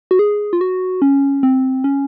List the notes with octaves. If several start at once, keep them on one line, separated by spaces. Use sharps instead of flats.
F#4
G#4
F4
F#4
C#4
C4
C#4